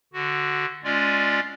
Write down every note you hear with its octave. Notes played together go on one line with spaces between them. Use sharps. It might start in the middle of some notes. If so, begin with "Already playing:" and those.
D3 F#4
G#3 C#4 F4 D5